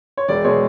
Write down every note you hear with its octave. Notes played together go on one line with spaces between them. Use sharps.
C#5
E1 D5
B2 G#3 C#5